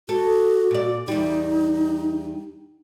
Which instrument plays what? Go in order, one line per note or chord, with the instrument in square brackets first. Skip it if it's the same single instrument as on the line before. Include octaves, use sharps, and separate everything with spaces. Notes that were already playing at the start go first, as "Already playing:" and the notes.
[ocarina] F#4 [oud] A4
[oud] A#2 D5
[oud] E2 G3 [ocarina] D#4